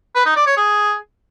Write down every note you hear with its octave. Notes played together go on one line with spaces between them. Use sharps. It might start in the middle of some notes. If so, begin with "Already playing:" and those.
B4
D#4
D5
C#5
G#4